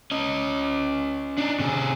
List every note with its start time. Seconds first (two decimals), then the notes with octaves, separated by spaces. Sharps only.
0.11 C#4 D#5
1.38 D4 D#4
1.59 C3 G#4